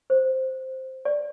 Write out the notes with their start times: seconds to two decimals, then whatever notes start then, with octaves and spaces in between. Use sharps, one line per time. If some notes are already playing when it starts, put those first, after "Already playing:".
0.10 C5
1.05 D5